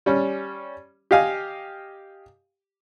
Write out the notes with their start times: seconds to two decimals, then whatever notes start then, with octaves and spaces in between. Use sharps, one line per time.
0.06 G3 C#4
1.11 G4 D#5 F5 G#5